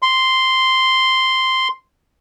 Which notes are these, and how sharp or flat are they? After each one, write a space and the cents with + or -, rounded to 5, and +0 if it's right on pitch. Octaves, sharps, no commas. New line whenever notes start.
C6 -5